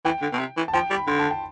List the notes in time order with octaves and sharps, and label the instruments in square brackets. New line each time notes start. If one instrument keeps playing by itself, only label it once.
[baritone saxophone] E3 [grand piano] G5
[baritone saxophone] D3
B2
C3
E3
[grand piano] A5
[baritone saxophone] F3 [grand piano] G5
[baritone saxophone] G3
[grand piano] B5
[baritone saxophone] D3 [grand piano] C6
[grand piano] A5
G5